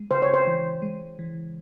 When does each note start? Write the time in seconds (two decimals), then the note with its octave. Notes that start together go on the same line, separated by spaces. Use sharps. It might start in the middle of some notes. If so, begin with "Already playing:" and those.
Already playing: G#3
0.11 C#3 C5
0.22 C#5
0.34 C5
0.47 E3
0.82 G#3
1.19 E3